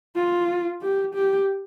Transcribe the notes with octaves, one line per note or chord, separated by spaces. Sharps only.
F4
G4
G4